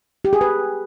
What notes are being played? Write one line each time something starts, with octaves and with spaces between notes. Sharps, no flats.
G4
G#4
B4